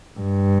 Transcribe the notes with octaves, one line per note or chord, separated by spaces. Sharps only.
G2